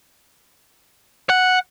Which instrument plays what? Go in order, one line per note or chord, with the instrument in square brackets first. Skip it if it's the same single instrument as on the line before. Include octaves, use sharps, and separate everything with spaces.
[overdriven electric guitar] F#5